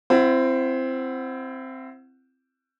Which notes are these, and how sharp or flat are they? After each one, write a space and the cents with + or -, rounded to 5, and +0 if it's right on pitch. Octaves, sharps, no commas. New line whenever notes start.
C4 +0 E4 +35 F#5 +0